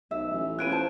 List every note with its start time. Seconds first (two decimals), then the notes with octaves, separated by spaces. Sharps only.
0.11 B1 E5
0.30 A1
0.59 C#4 F4 B4 F#6 D7 D#7
0.70 C5 A5